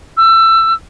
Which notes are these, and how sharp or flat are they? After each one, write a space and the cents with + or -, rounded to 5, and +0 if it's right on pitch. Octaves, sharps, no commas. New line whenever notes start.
E6 +20